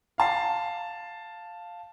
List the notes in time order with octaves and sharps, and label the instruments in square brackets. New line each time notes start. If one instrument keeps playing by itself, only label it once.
[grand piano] F5 A5 C7